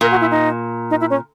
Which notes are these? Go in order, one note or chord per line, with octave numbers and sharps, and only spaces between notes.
A#2 A#4
F#4
E4
D#4
D#4
E4
C#4